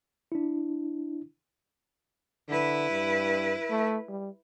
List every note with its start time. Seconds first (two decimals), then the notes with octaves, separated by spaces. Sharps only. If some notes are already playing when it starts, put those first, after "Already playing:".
0.32 D4 E4
2.49 D3 E4 B4
2.90 G2
3.70 A3
4.09 G3